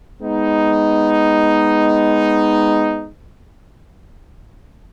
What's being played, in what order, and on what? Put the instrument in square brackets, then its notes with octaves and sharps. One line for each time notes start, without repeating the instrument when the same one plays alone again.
[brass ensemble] G#3 B3 D#4